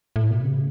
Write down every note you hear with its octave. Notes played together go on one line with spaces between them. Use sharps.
A2
B2
C#3